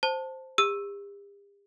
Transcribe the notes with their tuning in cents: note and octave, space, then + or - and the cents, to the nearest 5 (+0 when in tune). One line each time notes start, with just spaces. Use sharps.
C5 +0 A5 +5
G4 +45 E6 +0